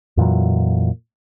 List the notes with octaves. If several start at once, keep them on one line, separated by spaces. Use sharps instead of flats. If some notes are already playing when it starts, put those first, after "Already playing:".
F2 A#2 E3 F#3